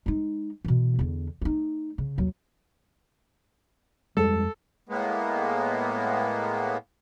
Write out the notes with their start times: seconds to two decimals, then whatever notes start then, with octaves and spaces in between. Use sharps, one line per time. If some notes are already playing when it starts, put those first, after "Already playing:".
0.06 G#3 D#4
0.65 B2 E3
0.99 E2 D3
1.42 A3 D#4
1.98 C#3
2.18 D#2 F#3
4.17 F2 G3 G#3 A4
4.89 A2 G#3 A#3 B3